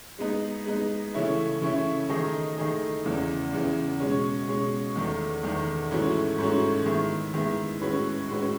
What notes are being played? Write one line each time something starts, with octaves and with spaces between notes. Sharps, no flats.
G#3 B3 D#4
G#3 B3 D#4
C#3 E3 A3 C#4 E4
C#3 E3 A3 C#4 E4
D#3 A3 D#4 G#4 D#5
D#3 A3 D#4 G#4 D#5
E2 C#3 E3
E2 C#3 E3
B2 G#3 C#4
B2 G#3 C#4
E2 D#3 A3
E2 D#3 A3
G#2 E3 A3 C#4 F#4
G#2 E3 A3 C#4 F#4
D#3 G#3 B3 E4
D#3 G#3 B3 E4
A2 G#3 C#4 F#4 B4
A2 G#3 C#4 F#4 B4